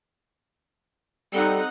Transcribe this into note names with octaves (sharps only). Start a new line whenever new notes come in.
G3 C4 D#4 A4 F#5